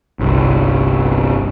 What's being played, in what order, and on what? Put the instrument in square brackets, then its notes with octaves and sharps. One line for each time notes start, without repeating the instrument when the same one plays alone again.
[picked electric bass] G1 C2